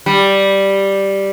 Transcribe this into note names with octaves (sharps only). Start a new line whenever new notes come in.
G3